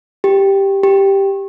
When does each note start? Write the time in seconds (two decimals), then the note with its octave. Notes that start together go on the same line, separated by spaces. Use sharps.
0.24 G4
0.83 G4